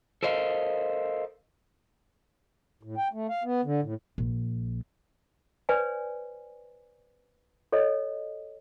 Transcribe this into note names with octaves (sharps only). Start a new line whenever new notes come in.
A4 A#4 C5 D#5 F5
A2
G5
A3
F5
B3
D3
A2
A#1
B4 C5 D5 G#5
A4 C#5 D#5